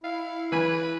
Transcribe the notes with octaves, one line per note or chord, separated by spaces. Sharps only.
E4 F5
E3 B4 G#5 B5